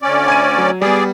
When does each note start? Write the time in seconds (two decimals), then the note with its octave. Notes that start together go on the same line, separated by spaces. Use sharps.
0.02 D2 C#4 D5
0.28 G#5 G#6 D#7
0.58 F#3
0.82 G3 B3 G#4 D5